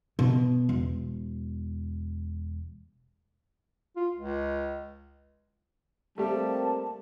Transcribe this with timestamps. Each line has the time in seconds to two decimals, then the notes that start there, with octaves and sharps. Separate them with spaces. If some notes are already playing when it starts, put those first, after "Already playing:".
0.19 B2
0.69 E1
3.96 F4
4.14 C#2
6.18 G3 A3 A#3 C4 G4 A5